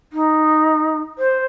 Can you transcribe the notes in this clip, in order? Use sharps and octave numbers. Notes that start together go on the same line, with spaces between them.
D#4
C5